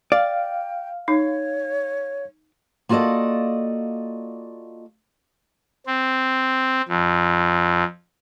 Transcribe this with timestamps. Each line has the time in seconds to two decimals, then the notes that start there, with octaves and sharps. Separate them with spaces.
0.12 D5 F5 G5
1.08 D#4 C#5
2.89 A#3 F4 F#4 A4 D5 D#5
5.87 C4
6.88 F2